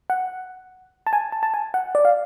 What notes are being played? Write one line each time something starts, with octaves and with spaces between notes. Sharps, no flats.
F#5
A5
G#5
A5
A5
G#5
F#5
D5
F5